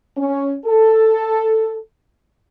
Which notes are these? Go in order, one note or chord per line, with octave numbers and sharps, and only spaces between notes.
C#4
A4